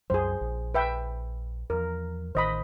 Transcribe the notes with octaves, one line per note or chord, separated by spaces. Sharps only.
C2 F#2 F#3 G#4 C5
A#1
B4 E5 G5
E2 F3 A#4
A1 D#3 C5 D#5 B5